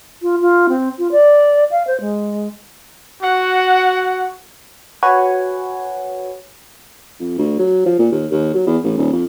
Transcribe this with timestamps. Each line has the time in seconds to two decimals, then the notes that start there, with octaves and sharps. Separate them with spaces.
0.22 F4
0.41 F4
0.69 C4
0.98 F4
1.11 D5
1.71 F5
1.87 C5
2.01 G#3
3.23 F#4 F#5
5.03 F#4 B4 C#5 F#5 G#5
7.20 F2
7.38 D2
7.59 F#3
7.86 F3
7.99 A#2
8.12 D#2
8.31 D#2
8.54 F#3
8.67 E2
8.84 A1
8.97 D#1
9.12 F2